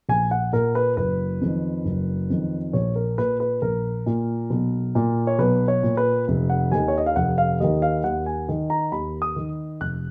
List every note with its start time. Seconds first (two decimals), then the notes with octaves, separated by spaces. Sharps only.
0.09 A#1 G#5
0.31 F#5
0.53 A#2 A#4
0.75 B4
0.97 F#1 B4
1.41 F2 D#3
1.85 F#1
2.30 F2 D#3
2.73 A#1 C#5
2.96 A#4
3.18 A#2 B4
3.40 B4
3.62 A#1 A#4
4.06 A#2
4.50 B1
4.95 A#2
5.27 C#5
5.39 B1 B4
5.68 C#5
5.83 A#2
5.97 B4
6.28 F1
6.50 F#5
6.71 D#2 D#3 G#5
6.88 C#5
6.98 D#5
7.06 F5
7.16 F1 F#5
7.38 F5
7.60 D#2 D#3 D#5
7.82 F5
8.04 D#2 F#5
8.26 G#5
8.49 D#3
8.70 A#5
8.92 D#2 B5
9.22 D#6
9.36 D#3
9.80 F1 F#6